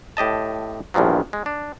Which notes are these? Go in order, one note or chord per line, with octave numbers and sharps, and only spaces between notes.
A2 G4 D#5 A5
A#1 E2 G2 F3 F#3
G#3
D4